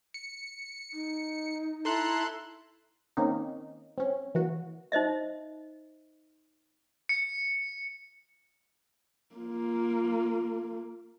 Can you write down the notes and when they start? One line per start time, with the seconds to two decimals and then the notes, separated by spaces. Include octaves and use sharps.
0.14 C#7
0.93 D#4
1.85 E4 A4 A#5 C6 F#6
3.17 D#3 A#3 C4 C#4 D#4
3.98 C4 C#4
4.35 E3 A#3 F#4
4.92 D#4 C5 D#5 E5
7.09 C#7
9.35 A#3 F4